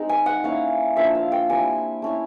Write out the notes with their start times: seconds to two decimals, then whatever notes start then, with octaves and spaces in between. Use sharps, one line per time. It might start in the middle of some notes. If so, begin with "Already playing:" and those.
Already playing: G#3 C4 D#4
0.09 G#5
0.26 F#5
0.44 A#3 C#4 E4 F5
0.96 F3 A#3 D4 F4 E5
1.15 F5
1.32 G5
1.49 G3 C4 E4 G#5
2.02 A3 C#4 E4